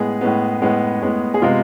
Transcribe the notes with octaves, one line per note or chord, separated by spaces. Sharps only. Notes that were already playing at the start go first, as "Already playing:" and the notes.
Already playing: A2 G#3 B3 G#4
A2 G#3 B3
A2 G#3 B3
A2 G#3 B3
G#4
C3 G#3 B3 F4